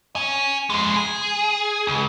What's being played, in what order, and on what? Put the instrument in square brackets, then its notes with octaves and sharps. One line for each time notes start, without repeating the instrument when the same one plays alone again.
[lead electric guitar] C#4 G#5
F2 G#3
G#4
C#2